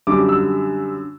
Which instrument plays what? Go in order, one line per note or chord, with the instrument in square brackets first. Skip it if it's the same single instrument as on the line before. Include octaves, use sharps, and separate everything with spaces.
[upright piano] F#2 D3 G3 D6
E6